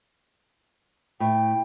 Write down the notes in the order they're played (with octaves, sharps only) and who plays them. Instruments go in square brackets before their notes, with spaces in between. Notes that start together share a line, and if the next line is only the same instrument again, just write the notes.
[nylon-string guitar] A2 [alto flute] G5